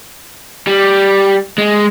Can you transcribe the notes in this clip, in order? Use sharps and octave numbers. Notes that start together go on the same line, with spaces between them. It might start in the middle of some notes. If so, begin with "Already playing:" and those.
G3
G#3